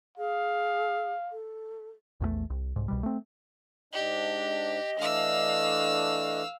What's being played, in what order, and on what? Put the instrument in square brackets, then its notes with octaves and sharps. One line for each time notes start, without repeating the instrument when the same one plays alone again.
[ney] G#4 [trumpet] F5
[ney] A4
[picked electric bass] A#1 E2 D#3 A3
C2
C2 G#2
C2 B2 G3
A3 C4
[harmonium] G#2 D4 [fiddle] G4 [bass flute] D#5
[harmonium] E3 A3 D4 [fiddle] F5 E6